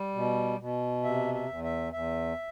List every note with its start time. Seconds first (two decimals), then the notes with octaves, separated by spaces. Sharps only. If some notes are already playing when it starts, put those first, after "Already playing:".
Already playing: G3
0.15 B2
0.59 B2
1.04 C3 E5
1.34 E5
1.49 E2
1.64 E5
1.93 E2 E5